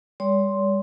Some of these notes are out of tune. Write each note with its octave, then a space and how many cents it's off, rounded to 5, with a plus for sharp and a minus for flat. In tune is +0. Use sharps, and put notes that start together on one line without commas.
G3 +35 C#5 +45 C6 +0